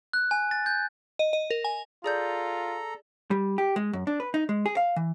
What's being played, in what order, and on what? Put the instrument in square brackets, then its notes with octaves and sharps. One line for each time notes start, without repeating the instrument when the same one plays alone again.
[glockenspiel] F#6
G#5
A6
G6
[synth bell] D#5
D#5
A#4
G#5
[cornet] F4 [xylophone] G#4 D5 G6 [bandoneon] A4 A#5
[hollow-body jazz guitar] G3
G4
G#3
F#2
D4
B4
D#4
G#3
G#4
F5
E3